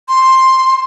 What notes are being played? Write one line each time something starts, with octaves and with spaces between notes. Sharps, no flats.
C6